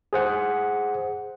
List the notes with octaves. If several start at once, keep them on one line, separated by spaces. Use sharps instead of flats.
G#4 C5 F#5